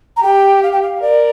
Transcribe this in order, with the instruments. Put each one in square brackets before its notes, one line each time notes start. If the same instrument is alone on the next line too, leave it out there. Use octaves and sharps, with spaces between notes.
[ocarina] A#5
[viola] G4 [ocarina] G5
[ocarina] F5
G5
F5
[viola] A#4 [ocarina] D5